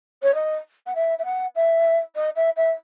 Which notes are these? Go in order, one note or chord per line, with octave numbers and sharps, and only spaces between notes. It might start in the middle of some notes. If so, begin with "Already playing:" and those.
C#5
D#5
F#5
E5
E5
F#5
E5
D#5
E5
E5